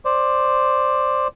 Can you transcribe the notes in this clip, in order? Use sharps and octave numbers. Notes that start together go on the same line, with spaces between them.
C5 D5